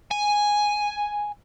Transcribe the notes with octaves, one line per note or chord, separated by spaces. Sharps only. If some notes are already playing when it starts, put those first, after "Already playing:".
G#5